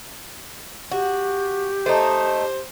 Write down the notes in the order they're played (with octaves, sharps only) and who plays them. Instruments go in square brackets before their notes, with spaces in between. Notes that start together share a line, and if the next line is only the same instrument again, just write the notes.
[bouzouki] F#4 [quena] G4
[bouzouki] A3 D#4 [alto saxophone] C5